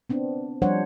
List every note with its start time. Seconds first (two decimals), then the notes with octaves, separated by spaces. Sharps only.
0.10 B3 C4 D4
0.62 F3 G3 D4 C5 C#5 F#5